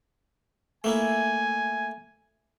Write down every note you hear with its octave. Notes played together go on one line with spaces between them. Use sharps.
A3 A#3 E4 G#5